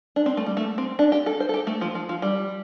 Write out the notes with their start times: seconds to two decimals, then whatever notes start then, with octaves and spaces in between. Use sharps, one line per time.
0.16 D4
0.26 C4
0.37 A3
0.46 G3
0.57 A3
0.78 C4
0.99 D4
1.12 G4
1.26 A4
1.40 C5
1.49 A4
1.54 G4
1.67 A3
1.81 F3
1.95 F3
2.09 F3
2.22 G3